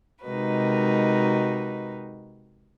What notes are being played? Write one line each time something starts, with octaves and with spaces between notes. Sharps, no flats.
C3 G#3 D#4 F#4 A#4 B4